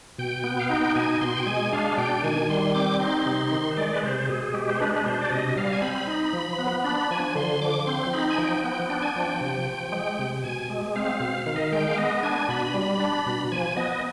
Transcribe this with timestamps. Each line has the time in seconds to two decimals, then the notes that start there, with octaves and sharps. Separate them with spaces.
0.18 B2 G5
0.44 B3
0.60 F5
0.70 D#4 G5
0.95 B2 G#5
1.21 B2 C6
1.37 G5
1.46 G#3 G#5
1.73 D4 F5
1.98 B2 G5
2.23 D#3 G#5
2.49 G3 C6
2.74 C4 D6
3.00 D#4 C6
3.26 C3
3.52 D#3
3.71 C5
3.77 G#3 D5
3.94 B4
4.03 C3 C5
4.28 B2 G#4
4.43 G#4
4.54 G#3 G4
4.70 C5
4.80 D4 B4
4.95 B4
5.05 B2 C5
5.21 D5
5.30 C3 D#5
5.56 G3 F5
5.72 G#5
5.82 C4 B5
6.07 D#4
6.33 F3
6.59 B3
6.84 D4 B5
7.11 F3 G#5
7.36 D3 C6
7.62 F3 D6
7.87 C4 C6
8.13 D#4 B5
8.30 G#5
8.38 F3 G5
8.64 B3 G5
8.90 D4 G5
9.02 G#5
9.15 F3 G5
9.41 C3
9.66 F3
9.92 G#3
10.19 C3
10.44 B2 G#5
10.70 G#3
10.96 C4 F5
11.20 B2
11.46 D#3 F5
11.56 D#5
11.64 F5
11.72 G#3 G5
11.88 F5
11.97 B3 D#5
12.23 D4 G#5
12.48 B2 B5
12.74 G3
12.99 D4
13.26 B2
13.52 F3 G#5
13.77 B3 D#5
13.92 D#5